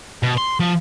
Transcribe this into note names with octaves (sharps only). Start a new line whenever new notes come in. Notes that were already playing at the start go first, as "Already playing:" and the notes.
B2
C6
F3